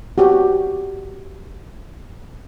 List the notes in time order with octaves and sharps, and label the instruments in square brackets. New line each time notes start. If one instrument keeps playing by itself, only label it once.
[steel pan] F#4 G4